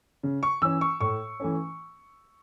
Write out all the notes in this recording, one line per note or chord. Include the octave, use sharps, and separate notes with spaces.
C#3
C#6
E3 C#4 E6
C#6
A2 C#6
E3 A3 C#4